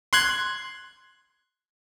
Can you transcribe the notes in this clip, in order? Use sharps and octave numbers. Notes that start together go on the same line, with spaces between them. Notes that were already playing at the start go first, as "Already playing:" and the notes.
C6 F#6 G#6